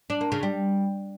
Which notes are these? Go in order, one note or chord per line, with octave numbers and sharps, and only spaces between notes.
D4
A#3
C#3
G3